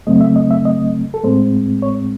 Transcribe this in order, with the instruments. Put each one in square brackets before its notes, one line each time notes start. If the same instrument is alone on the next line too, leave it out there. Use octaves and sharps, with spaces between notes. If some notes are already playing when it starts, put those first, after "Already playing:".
[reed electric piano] F#2 C#3 F#3 A3 C4 D#5
E5
D#5
E5
D#5
A4
A2 G#3 C4 C5
C#5